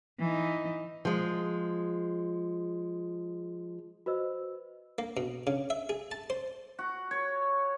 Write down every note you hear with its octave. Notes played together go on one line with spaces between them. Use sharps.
E3 D#4
F3 G#3
F#4 B4 C5 D#5 E6
A#3
B2
C#3
E5
G#4
A5
C5
F#4
C#5